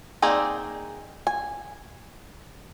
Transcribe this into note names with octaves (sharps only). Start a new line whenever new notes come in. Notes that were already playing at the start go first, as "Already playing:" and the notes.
A#3 C4 D#4 G#4 D5
G#5